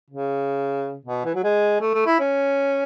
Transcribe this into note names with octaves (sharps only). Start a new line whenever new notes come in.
C#3
B2
E3
F#3
G#3
A3
A3
E4
C#4